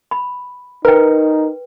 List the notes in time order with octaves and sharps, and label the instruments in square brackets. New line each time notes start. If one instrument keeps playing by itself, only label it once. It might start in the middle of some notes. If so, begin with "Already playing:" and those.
[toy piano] B5
[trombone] D#4 [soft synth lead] A#4 [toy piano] B4 G5